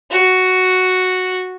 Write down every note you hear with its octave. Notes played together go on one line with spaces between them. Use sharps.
F#4